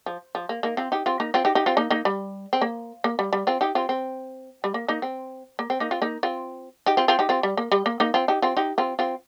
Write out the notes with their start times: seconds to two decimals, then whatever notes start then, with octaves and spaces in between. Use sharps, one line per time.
0.06 F3
0.35 F3
0.49 A#3
0.63 A#3 D#4
0.77 C4 F4
0.92 D#4 G4
1.06 C4 F4
1.20 A#3 D#4
1.34 C4 F4
1.45 D#4 G4
1.55 D#4 G4
1.66 C4 F4
1.77 A#3 D#4
1.90 A#3 D#4
2.05 G3
2.53 C4
2.62 A#3
3.04 A#3
3.19 G3
3.33 G3
3.47 C4 F4
3.61 D#4 G4
3.75 C4 F4
3.89 C4
4.64 G3
4.74 A#3
4.88 A#3 D#4
5.02 C4
5.59 A#3
5.70 C4
5.80 A#3 D#4
5.91 C4 F4
6.02 A#3 D#4
6.23 C4 F4
6.86 D#4 G4
6.97 C4 F4
7.08 C4 F4
7.19 D#4 G4
7.29 C4 F4
7.43 G3
7.57 A#3
7.72 G3
7.86 A#3
8.00 A#3 D#4
8.14 C4 F4
8.28 D#4 G4
8.42 C4 F4
8.57 D#4 G4
8.78 C4 F4
8.99 C4 F4